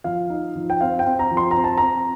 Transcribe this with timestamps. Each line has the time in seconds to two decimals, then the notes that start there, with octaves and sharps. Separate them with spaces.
0.04 F3 F5
0.30 D#4
0.56 F3
0.70 G5
0.81 C4 F5
0.99 G5
1.06 C4
1.19 A#5
1.31 F3
1.37 C6
1.51 A#5
1.56 C4
1.64 A5
1.78 C4 A#5